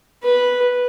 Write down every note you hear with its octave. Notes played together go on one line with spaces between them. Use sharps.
B4